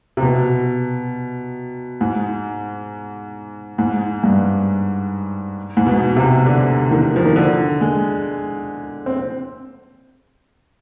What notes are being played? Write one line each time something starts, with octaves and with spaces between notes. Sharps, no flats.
C3
B2
G#2
G#2
G2
G#2
B2
C3
D3
D#3
F3
D#3
D3
G#3
C4